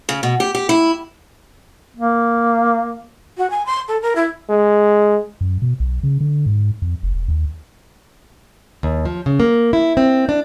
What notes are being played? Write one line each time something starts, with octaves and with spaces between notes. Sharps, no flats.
C#3
B2
G4
G4
E4
A#3
F#4
G#5
C6
A4
A#4
E4
G#3
F#2
B2
B1
C#3
D3
G#2
F2
F1
E1
D#2
D#2
F3
C#3
A#3
E4
C4
D4